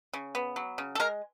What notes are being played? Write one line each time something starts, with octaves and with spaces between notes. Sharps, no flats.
C#3
B3
F#3
C#3
A4
G#3 A#4